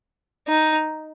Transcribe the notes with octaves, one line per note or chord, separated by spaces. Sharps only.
D#4